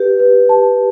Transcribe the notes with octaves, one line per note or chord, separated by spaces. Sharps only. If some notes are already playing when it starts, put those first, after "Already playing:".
Already playing: G4 B4
B4
A5